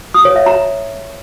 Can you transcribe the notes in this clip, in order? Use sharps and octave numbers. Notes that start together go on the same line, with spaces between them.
D#6
C#5
E5
A#5